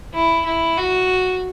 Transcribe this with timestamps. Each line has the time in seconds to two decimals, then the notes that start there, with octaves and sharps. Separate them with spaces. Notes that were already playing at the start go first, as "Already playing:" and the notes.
0.14 E4
0.46 E4
0.78 F#4